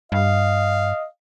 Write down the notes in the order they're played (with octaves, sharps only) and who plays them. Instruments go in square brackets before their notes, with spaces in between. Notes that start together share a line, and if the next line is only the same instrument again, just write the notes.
[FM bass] G2 [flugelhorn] D#5 [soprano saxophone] F5